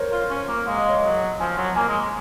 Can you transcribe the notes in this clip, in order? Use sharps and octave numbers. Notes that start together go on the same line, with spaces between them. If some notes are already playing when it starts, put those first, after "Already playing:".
Already playing: A#4 C5 C#5
F4
C#4
A#3
G#3 F5
D#5
C#5
F#3 D#5
F3 G#5
F#3
A#3 G#5
G#3